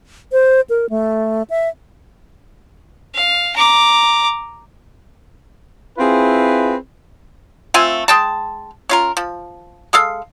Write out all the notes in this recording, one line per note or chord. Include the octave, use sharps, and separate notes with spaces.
C5
A#4
A3
E5
F5
A#5 D6
C4 E4 F4 G#4 B4
A3 C4 F4 G#5
G#3 G5 A5
C#4 F4 A#4
F3
G#3 A4 F5